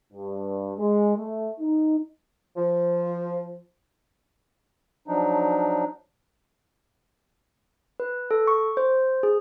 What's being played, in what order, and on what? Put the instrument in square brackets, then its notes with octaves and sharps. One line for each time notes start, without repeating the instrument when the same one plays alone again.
[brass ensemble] G2
G#3
A3
D#4
[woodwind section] F3
[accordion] F3 F#3 D4 D#4
[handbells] B4
A4
C#6
C5
G#4